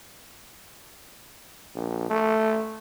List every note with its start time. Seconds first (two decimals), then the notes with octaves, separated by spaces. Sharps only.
1.76 A#1
2.10 A3